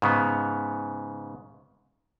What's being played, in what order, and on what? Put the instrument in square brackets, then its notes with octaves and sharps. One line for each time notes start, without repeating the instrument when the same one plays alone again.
[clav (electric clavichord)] G#2 C#3 B3